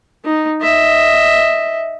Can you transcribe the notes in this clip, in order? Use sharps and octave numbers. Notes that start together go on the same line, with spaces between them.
D#4
D#5 E5